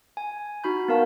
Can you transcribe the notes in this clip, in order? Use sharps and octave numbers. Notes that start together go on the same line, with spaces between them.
G#5
D#4 F#4 B5 G6
B3 D#4 A#4 F5 A5